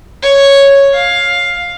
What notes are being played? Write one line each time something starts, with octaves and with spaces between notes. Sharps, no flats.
C#5
F5